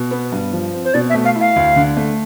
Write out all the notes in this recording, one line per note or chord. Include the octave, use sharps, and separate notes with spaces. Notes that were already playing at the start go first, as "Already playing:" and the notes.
Already playing: B2
B3
G2
F3
C4
C5
B2 D5
E5
A3
F5
E4
F5
D2
D3
A3